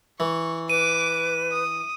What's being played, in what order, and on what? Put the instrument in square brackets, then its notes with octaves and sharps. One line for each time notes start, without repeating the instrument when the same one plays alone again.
[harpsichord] E3 [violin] C#6
[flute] B4 [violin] D6 [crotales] D#7
[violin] D#6